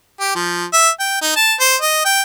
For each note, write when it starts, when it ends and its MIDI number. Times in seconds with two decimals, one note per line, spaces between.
0.20 0.32 67
0.35 0.65 53
0.73 0.89 76
0.99 1.18 79
1.21 1.32 63
1.36 1.54 81
1.60 1.76 72
1.81 2.02 75
2.05 2.22 79